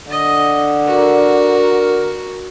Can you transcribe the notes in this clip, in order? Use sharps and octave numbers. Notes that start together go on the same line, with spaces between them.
D3 D#5
F#4 A#4